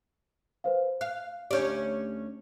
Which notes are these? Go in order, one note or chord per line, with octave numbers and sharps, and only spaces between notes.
B4 C5 F5
F5 F#6
D2 C#4 G4 D5 G6